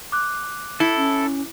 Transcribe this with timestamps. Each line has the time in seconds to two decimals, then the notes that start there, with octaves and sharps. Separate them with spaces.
0.12 D6 F#6
0.80 E4 A4
0.97 C#4